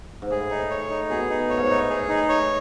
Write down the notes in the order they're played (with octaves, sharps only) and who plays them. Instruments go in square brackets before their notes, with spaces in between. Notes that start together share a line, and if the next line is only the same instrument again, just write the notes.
[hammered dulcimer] G#2
[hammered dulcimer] A2 [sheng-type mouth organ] G#4
[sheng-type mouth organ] D#4
C#5
D#4
[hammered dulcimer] B2 [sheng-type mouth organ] G#4
[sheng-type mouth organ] D#4
[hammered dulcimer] A2 [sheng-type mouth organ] C#5
[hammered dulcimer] G#2
[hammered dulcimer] A2 [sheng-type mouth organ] D#4
[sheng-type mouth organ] G#4
D#4
C#5